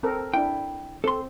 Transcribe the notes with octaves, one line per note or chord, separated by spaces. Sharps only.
C4 A4 A#4
D4 E4 G5
C4 A4 C6